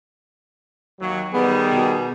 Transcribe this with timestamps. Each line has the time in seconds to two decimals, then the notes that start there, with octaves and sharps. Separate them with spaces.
1.00 D#2 F#3
1.34 D#3 G3 B3 G#4
1.74 B2